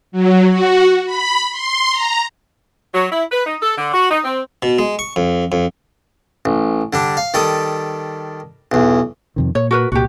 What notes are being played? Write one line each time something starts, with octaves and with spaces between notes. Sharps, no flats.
F#3
F#4
B5
C6
A#5
F#3
E4
B4
D#4
A4
D3
F#4
D#4
C4
B2
G#3
C#6
F2
F2
A1
D3 G3 D4
F5
D#3 G3 A4 D#6
B1 E2
F2 C3 D#3
A#2 C#5
F#4 A#4 B4
C2 A#2 F#4 G4